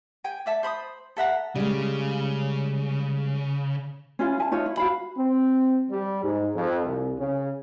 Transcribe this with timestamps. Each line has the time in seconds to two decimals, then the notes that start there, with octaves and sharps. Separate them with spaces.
0.24 G5 G#5
0.46 D5 E5 A5
0.63 C5 B5 C6 D#6
1.17 A4 E5 F#5 A#5
1.56 C#3 G3 G#3
4.19 C#4 E4 F4
4.38 E4 G#5 A5
4.52 D#4 F4 C#5 E5
4.66 E4
4.77 F#4 F5 B5
5.18 C4
5.90 G3
6.24 G#2
6.55 F2
6.86 C2
7.19 C#3